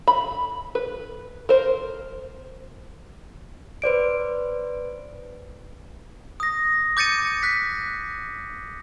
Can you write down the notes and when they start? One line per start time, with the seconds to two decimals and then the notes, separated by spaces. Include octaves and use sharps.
0.08 B5
0.75 B4
1.49 A#4 C5
3.82 B4 C5 D5 D7
6.40 D#6 A#6
6.97 D6 G6 A6 C#7 D#7
7.43 F#6 B6